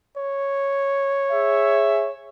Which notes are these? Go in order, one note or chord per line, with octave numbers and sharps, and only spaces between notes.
C#5
G#4 E5